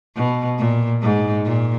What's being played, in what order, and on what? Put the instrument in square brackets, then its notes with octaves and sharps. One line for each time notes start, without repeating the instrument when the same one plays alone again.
[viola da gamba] B2
A#2
G#2
A#2